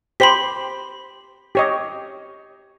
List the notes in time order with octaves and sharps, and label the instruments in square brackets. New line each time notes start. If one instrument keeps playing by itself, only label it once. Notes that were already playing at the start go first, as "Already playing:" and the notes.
[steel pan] G4 C5 G5 [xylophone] B5 C6 B6
[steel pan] G4 C#5 D#5